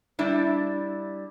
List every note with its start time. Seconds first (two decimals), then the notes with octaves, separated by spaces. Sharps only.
0.19 G3 D4 E4